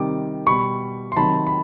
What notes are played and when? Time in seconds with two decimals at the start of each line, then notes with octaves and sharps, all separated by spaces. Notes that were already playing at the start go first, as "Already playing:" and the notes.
Already playing: C3 D#3 G3 D6
0.46 B2 G3 B5 C#6
1.12 C6
1.16 C3 D#3 F#3 A5 B5
1.47 B5